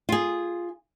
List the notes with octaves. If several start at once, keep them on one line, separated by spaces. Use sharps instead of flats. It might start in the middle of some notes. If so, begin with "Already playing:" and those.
F4 G#4